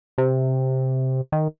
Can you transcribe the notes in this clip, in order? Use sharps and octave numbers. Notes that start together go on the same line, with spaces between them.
C3
D#3